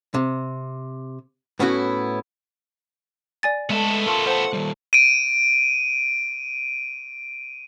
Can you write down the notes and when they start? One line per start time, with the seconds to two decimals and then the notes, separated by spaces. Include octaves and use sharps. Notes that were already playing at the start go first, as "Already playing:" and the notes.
0.14 C3
1.59 A2 B3 C#4 D#4 E4 F#4
3.43 D5 G#5 A6
3.70 G#3 A3 B3 A4
4.07 F4 A#4 A5 C#6 D6
4.27 C5 F#5 A5
4.53 D#3 G3
4.93 D7 D#7